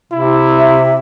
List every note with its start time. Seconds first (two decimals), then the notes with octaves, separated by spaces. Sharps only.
0.12 C3 E4
0.58 E5